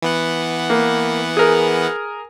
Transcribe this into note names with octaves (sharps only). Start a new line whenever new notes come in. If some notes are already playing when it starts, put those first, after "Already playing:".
E3 B3 F#5
A#3
G#4 A#4